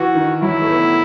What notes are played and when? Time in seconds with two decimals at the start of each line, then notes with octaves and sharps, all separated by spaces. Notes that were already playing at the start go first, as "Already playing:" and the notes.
Already playing: E3 F#4
0.15 D#3
0.41 F#3 E4
0.62 A3
0.69 B3